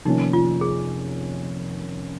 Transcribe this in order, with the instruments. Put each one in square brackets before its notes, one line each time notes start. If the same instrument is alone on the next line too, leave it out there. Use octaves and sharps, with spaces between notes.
[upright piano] F1 F2 D#3 A#3 C#4 [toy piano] D#4
[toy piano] F4
G#4